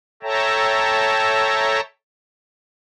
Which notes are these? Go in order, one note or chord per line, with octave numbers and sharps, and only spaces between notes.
A4 C#5 E5 G5 A5 A#5